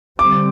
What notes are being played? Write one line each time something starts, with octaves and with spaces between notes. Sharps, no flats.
D3 G3 C4 D6